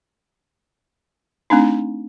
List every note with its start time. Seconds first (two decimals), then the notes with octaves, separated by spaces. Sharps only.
1.50 A3 C4 D4 D#4